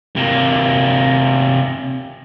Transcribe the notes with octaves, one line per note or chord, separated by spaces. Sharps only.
C3 A#3